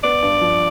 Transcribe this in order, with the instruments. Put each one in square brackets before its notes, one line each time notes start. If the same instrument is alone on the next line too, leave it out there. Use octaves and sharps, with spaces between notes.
[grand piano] B3 [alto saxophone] D5
[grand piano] G2
F3